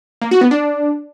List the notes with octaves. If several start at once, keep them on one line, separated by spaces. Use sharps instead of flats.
A#3
F#4
B3
D4